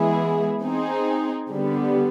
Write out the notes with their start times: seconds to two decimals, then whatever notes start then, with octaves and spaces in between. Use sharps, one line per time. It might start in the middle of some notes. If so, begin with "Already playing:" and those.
Already playing: E3 G#3 B3 E4 G#4
0.63 C4 D#4 G#4
1.50 D3 G3 B3